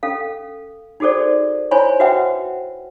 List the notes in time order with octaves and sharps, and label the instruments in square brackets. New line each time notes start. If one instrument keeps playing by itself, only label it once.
[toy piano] C#4 A4 F5
D#4 F#4 G#4 A4 C5 D5
E4 C5 C#5 G#5 B5 C6
F#4 B4 C5 E5 F#5 G5